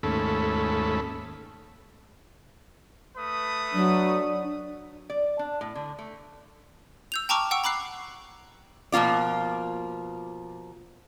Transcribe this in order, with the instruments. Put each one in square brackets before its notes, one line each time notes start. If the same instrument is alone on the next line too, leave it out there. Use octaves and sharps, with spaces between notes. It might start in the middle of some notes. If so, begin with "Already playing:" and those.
[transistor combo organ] D#2 G#2 A3 C#4 A4 B5
[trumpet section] A3 B4 D#6
[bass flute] F#3 [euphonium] D4
[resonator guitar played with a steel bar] D5
D4
A2
D3
A3
[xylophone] E6 G6 F7
G5 A5 A#5 C#6 D6 F6
F#5 G5 C#6 E6
A#5 B5 D6 F#6 C7
[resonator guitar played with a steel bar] B2 F3 A#3 F4 D5